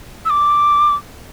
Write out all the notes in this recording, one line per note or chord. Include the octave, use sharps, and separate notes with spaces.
E6
D6